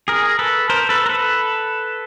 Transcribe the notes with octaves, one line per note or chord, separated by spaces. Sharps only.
G#4 A#4
A4 B4
A#4 C5
A4 B4
A#4
A4 B4